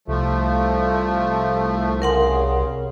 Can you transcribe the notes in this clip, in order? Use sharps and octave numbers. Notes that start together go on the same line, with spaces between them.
C2 F3 A3
C#3 A#4 F#5 C6